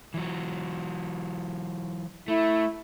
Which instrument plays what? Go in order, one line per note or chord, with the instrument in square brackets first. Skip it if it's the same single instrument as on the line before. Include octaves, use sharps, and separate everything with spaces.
[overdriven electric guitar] E3 F#3
[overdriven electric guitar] A3 [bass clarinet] E4